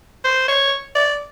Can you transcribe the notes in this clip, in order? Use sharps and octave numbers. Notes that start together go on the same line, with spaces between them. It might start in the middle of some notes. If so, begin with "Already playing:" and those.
C5
C#5
D5